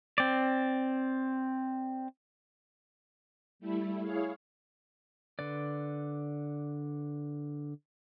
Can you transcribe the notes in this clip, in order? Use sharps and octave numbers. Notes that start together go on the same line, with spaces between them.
C4 D5
G3 A3 E4
E4 G#4 C#5 F5
D3 B4 D5